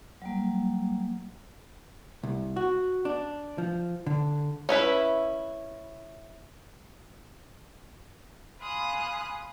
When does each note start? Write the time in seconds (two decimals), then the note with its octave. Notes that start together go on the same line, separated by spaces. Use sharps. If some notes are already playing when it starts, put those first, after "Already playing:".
0.22 F#3 G3 A#3
2.23 C2
2.56 F#4
3.05 D4
3.58 F3
4.06 D3
4.69 C#4 E4 B4 E5
8.62 F5 G#5 B5 C6 D#6 F#6